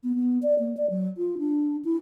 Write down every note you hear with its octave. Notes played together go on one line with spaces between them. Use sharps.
B3
B3
D5
A#3
D5
F#3
F4
D4
E4